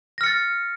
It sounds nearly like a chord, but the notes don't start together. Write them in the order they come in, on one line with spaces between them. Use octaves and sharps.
A#6 F6 C#7 A6